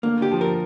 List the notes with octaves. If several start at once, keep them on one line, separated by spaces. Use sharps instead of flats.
D3 A#3
D3 G4
F3
A#4